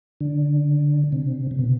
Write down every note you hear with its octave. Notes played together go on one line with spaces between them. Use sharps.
D3
C3
C3
B2